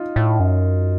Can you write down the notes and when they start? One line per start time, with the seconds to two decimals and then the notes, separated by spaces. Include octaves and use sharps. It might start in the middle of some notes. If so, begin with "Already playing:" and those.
Already playing: D#4 F4
0.16 A2
0.40 F#2